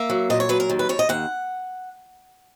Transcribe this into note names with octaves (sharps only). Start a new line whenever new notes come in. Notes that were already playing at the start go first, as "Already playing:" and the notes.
Already playing: A#3 E5
F#3
A#2 D#5
C#5
F#3 B4
A#4
D#2
B4
D#2 C#5
D#5
D#2 F#5